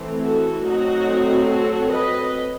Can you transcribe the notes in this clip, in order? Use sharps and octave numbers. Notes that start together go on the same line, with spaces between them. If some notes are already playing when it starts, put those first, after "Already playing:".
Already playing: E3 A3 C4
F#4 A4
F#3 A3 C4 D#4 F#4
F#4 A4
B4 D#5